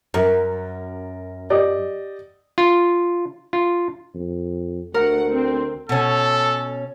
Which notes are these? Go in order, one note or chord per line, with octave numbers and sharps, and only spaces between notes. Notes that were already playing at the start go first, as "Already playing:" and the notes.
F#2 A#4
G4 D5 D#5
F4
F4
F2
D2 A3 A#4 F#5
C4
B2 C#4 A4